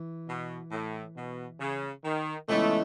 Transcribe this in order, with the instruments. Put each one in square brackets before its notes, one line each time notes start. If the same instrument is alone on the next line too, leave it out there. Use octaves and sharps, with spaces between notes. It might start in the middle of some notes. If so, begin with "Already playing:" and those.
Already playing: [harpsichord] E3
[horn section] B2
A2
B2
C#3
D#3
[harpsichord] C#2 C#3 E3 G#3 B3 [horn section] A3